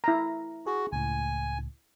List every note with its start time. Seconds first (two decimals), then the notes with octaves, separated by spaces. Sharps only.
0.04 E4 A#5
0.66 F#4 G#4
0.92 C#2 A2 G#5